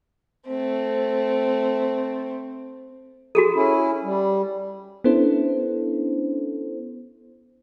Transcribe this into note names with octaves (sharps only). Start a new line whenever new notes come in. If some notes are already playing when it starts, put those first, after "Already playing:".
A3 C4
F#4 G#4 A4
C#4 E4
G3
B3 C#4 D4 E4 A4 C5